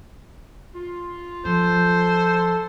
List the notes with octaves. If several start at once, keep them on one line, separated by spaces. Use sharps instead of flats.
F4
F3 A4 C5